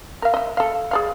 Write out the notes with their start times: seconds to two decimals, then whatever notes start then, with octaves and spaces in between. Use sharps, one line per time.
0.22 A#4 F5
0.34 D#5 E5
0.57 A4 F5
0.91 G#4 D5 F5